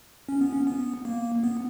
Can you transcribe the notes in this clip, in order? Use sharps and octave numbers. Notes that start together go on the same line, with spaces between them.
C#4
B3
C#4
B3
A#3
B3